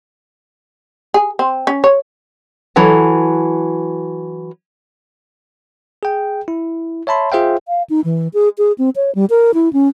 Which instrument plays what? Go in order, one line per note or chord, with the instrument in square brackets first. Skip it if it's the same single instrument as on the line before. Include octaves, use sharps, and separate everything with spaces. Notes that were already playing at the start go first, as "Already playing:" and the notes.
[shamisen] G#4
C4
C#4
C#5
[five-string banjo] E3 F#3 A4
[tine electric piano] G#4 G5
E4
C#5 E5 A5 B5 C6
F4 G#4 C5 E5 F5 G5
[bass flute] F5
D#4
E3
G#4
G#4
C4
C#5
G3
A#4
E4
C#4